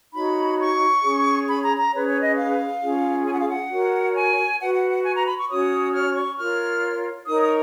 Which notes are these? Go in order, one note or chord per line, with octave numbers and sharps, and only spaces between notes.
D#4 F#4 C#5 B5
C#6
C#4 G#4 C#5
B5
A#5
A#5
C#4 G#4 B4 C#5
C#5
D#5
F5
C#4 F4 G#4
G#5
F#5
F5
F#5
F#4 A#4 C#5
G#5
F#4 B4 F#5
F#5
F#5
G#5
A#5
B5
C#6
C#4 F#4 C#5 D#6
F6
C#6
F4 A#4 C#5 F6
D#4 A#4 C#5 D#6
D#6